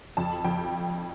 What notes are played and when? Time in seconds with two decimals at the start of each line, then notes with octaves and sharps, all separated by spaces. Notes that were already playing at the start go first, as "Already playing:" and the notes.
0.17 F2 A5
0.45 F2 G5